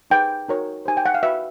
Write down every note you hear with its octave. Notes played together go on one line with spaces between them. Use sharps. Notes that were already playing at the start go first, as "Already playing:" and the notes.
D#4 G#4 B4 G5
D#4 F#4 A#4 C#5
D#4 G4 C5 G#5
G5
F#5
F5
F#4 B4 E5